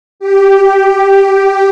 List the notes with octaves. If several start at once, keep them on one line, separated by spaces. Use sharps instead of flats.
G4